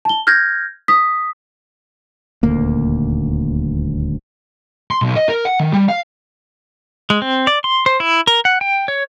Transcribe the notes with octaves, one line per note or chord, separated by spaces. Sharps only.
A5 G7
F6 G6 G#6 A#6
D#6 B6
D#1 D2 A#3
C6
B1
D#5
A#4
F#5
D#3
G3
F5
G#3
C4
D5
C6
C5
E4
A#4
F#5
G5
C#5